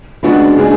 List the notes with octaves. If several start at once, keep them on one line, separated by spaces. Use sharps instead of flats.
C#3 G#3 B3 D4 F#4
C#3 G#3 D4 G#4